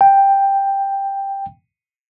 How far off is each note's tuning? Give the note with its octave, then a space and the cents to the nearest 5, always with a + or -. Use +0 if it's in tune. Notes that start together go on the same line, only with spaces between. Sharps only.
G5 +5